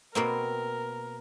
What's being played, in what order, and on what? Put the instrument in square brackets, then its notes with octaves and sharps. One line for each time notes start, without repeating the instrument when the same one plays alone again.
[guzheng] B2 A#3 C4 [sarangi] A#4